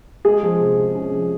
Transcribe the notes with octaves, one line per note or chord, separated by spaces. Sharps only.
G#3 G#4
F3
C3
C3
C#4
F3